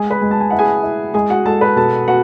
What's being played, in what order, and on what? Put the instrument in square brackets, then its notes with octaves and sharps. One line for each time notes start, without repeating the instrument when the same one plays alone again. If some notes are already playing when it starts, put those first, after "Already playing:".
Already playing: [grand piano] G#3 [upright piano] G#4 G#5
[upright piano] B4 B5
[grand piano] G#3
[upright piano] A5
G#5
[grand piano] E4 [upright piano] F#5
[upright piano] G#4 G#5
[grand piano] E4
[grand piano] G#3 [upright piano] G#4 G#5
[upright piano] F#4 F#5
[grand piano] G#3 [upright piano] A4 A5
[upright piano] B4 B5
[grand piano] B2 [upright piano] A4 A5
[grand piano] B3 [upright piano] F#4 F#5